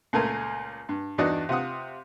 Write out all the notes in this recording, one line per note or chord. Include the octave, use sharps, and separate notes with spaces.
C#2 A#2 A3 A#4 G#5
G2
E2 G2 D#4 F#4 D5 F#5
C3 F4 F#5 D#6